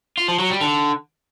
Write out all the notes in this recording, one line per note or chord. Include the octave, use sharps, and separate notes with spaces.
F4
F3
F#3
G3
D3